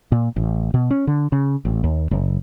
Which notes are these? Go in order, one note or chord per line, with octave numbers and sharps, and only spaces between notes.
A#2
A1
B2
C#4
D3
C#3
A1
D#2
F#1